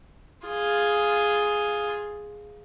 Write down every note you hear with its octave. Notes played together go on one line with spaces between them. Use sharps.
F4 G#4